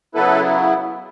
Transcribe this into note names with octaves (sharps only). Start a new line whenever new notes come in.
C#3 F#3 B3 E4 A4 B4